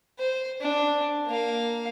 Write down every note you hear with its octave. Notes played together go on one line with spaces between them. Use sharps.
C5
D4
A#3 F5